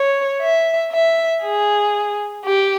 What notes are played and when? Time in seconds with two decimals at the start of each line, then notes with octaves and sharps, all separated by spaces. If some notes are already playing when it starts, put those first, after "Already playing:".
Already playing: C#5
0.42 E5
0.92 E5
1.43 G#4
2.45 G4